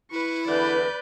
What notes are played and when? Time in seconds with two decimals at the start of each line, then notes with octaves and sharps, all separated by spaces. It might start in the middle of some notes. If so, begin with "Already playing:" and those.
0.11 E4 B4 C#6
0.47 E2 D3 E3 B4 D5 G6